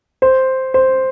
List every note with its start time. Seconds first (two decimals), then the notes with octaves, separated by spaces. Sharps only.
0.22 C5
0.74 C5